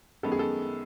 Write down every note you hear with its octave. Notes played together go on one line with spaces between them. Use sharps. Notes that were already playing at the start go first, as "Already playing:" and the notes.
F#2 D#3 G#3 B3 A4
G#4
A4